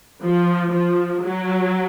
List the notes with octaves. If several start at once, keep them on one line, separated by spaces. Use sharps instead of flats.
F3
F3
F#3